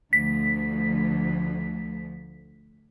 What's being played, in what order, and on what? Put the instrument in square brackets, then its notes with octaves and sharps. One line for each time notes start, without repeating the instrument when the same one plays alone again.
[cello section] D2 F3 [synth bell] B6